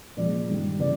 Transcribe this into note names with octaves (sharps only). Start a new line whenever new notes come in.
A#2 F3 G#3 D5
G2 D#3 G3
C#3 E3 D5